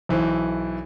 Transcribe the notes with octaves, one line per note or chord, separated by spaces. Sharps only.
B1 E3 C5